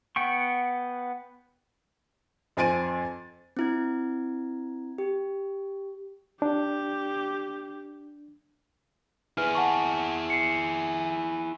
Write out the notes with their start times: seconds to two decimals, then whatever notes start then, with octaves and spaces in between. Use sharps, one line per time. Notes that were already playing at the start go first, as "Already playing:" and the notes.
0.16 B3 F#5 G5 C#6
2.57 F2 C4 G#5 A6 D7 D#7
3.57 C4 E4 G#6
4.98 G4
6.42 D4 G4
9.38 E4 G#4 B4 F6
9.55 F#5 A5 C#6
10.30 C7 C#7